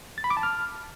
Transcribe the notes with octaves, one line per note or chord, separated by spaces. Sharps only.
A6
B5
D6
A5
F6